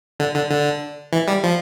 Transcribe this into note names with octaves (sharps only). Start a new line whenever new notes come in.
D3
D3
D3
E3
G3
F3